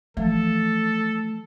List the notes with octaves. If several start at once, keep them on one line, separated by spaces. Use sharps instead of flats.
E3 F3 A3 A4